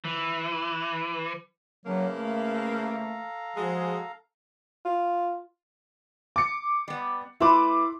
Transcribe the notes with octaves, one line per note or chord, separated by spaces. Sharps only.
E3
C#3 E3 F#3 A#3 D4
A3
A4 F5 A#5
F3 G#3 F#4 G#4
F4
D6 C#7
G3 B3
A3 E4 B4 C6 D6